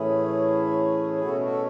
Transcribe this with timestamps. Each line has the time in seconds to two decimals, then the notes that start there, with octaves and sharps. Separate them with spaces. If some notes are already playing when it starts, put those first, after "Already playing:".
Already playing: A2 E3 A3 C#4 E4 G#4
1.21 B2 A3 C#4 F#4 A4
1.41 F#4 A4